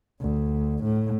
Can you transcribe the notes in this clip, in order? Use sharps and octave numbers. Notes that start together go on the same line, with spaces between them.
D2
A2